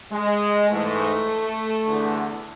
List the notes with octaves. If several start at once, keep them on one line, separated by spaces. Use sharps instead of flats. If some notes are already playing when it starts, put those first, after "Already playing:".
G#3
G#2 E3 A3
E2 D3